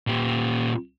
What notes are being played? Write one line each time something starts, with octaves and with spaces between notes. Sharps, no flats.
A#2 G4